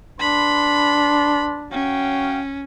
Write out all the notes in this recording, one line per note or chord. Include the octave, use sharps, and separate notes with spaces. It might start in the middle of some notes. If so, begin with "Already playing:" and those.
D4 B4 B5 C6
F#3 C#4 F5 G5